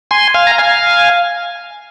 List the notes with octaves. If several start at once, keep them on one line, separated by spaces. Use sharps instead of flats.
G#5 C6
F5 G#5
A#5
F5 G#5